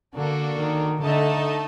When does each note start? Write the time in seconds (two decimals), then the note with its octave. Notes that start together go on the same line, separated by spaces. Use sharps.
0.15 D3 A#3 D4 F#4 A4
0.59 D#3
1.02 D3 A3 D#4 A4 D#5 A5